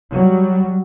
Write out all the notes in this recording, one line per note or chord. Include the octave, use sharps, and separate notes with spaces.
F#3 G3